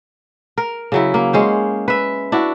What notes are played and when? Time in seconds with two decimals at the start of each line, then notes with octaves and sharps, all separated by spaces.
0.58 A#4
0.92 C#3 F#3 E4
1.14 A#3
1.33 G#3 C#4 C5
1.88 B4 E5
2.32 D4 E4 F#4